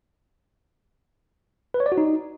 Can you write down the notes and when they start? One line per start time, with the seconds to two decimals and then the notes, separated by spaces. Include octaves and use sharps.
1.74 B4
1.80 C#5
1.86 D5
1.92 F#4
1.98 D#4